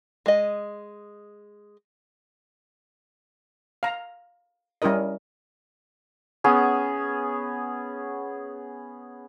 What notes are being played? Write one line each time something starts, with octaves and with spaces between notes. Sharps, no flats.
G#3 D#5
F5 A#5
G3 C#4 E4 A#4 D#5
B3 C#4 G#4